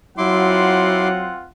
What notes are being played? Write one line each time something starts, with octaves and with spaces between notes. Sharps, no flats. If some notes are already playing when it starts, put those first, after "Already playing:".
F#3 C4 E4 F4 F#5 C6 D6